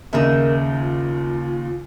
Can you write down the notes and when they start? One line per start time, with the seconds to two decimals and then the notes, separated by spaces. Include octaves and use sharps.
0.13 D#2 C#3 D#4 A#4 E5
0.71 F4